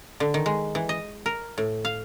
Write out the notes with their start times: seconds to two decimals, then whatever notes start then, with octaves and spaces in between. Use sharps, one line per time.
0.20 D3
0.34 D#3
0.46 G#3
0.75 E3
0.89 D#5
1.26 A#4
1.58 A2
1.85 F5